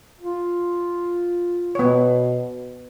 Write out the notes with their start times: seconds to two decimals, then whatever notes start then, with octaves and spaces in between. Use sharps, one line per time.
0.21 F4
1.75 B2 B3 C#5